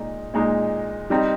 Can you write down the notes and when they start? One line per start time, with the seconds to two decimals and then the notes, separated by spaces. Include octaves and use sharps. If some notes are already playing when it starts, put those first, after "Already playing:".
Already playing: A#2 G#3 D#4
0.34 A#2 G#3 D#4
1.10 G3 C4 D#4